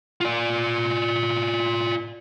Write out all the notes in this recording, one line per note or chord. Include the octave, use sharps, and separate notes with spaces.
F4 D5